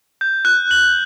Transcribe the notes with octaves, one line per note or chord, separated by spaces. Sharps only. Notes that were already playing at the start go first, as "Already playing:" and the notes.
G6
F#6
F#7